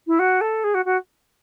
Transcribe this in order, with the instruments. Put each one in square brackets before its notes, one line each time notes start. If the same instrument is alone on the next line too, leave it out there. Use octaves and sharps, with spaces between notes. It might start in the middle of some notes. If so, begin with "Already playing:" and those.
[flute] E4
F#4
A4
G#4
F#4
F#4